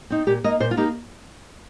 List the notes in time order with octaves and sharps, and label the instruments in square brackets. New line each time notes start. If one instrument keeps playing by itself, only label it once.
[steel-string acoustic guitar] C4 D#4
A#2 G4
A#3 D#4 D#5
A#2 C5
F4
A#3 D#4 G4